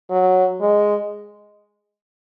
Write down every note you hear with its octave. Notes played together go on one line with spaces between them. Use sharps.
F#3
G#3